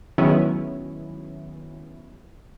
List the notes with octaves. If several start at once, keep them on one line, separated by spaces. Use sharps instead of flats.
D#3 F#3 G#3 B3 C#4 E4